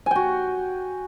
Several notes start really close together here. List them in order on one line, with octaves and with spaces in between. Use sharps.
G#5 G5 F#4